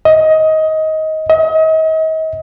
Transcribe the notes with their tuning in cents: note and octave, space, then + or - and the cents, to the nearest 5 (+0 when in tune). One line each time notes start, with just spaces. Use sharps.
D#5 +20
D#5 +40